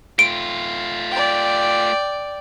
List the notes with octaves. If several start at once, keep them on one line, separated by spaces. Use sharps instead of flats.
A3 F4 D7
D5 G5